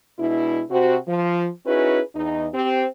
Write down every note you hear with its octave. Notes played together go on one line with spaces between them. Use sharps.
B2 G#3 D4 E4
C3 C4 F#4
F3
C#4 D#4 E4 F#4 G#4 B4
E2 D#4
C4 G4